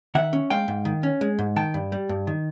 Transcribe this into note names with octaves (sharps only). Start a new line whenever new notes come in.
D#3 E5 F#5
C#4
G#3 F5 G5
G#2
D#3
C#4
G#3
G#2
D#3 G5 A5
G2
G3
G2
D#3